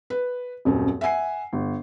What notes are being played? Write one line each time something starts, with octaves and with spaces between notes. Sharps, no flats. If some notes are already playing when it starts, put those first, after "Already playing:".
B4
D#1 F#2 C4
E5 F#5 G#5 C7
G1